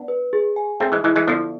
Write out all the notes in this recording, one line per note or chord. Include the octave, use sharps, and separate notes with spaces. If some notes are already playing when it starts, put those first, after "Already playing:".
Already playing: B3 D4
B4
G#4
G#5
A3 C4 G#4
E3 G#3
E3 G#3 E4
E3 G#3
D3 F3 B3